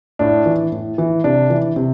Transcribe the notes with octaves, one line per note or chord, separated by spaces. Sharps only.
A2 D4
E3
A2
E3
C3 D4
E3
C3